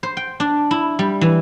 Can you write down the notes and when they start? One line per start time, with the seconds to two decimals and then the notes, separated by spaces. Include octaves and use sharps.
0.03 C5
0.17 G5
0.40 D4
0.71 E4
0.99 G3
1.21 E3